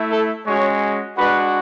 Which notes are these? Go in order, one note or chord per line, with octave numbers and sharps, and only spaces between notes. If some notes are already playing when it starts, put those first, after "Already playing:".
Already playing: A3 E4
A4
G#3 C#4 F#4 C#5
G#3 D4 F#4 B4